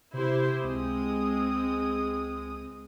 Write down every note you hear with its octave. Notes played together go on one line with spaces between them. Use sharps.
C3 E4 G4 C5
C#2 G#3 C4 D#6